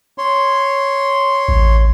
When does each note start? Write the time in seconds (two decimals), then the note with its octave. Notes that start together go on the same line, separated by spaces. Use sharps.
0.18 C#5 C6
1.48 A1